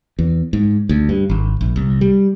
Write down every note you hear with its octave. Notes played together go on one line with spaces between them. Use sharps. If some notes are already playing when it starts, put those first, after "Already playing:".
E2
G#2
D2
G2
G#1
A#1
C2
G3